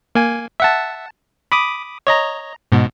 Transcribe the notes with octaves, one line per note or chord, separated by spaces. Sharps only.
A#3 G#5
E5 F#5 A5
B5 D6 D#6
C#5 D#5 A#5
G#2 B2